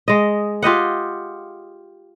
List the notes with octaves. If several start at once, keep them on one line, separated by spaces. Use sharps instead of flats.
G#3 D#5
F4 G4 D#5 F#5